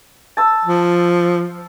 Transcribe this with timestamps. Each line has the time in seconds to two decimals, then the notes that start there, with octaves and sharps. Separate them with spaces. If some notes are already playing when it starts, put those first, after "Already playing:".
0.37 A5 E6
0.65 F3